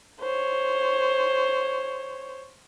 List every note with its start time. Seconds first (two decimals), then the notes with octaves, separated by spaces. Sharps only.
0.20 C5 C#5